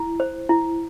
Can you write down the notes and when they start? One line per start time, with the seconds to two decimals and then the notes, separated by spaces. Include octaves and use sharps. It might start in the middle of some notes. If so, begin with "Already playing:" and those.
Already playing: E4
0.20 C5
0.49 E4